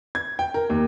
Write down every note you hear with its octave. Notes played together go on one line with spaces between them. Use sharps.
G#6
G5
A#4
D#2